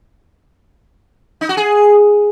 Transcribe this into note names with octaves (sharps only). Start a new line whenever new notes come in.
D#4
F#4
G#4